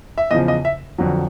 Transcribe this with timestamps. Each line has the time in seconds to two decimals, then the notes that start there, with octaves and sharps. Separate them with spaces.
0.18 E5
0.31 E2 C#3 F3 D#5
0.48 D#5
0.65 E5
0.98 F2 D3 F#3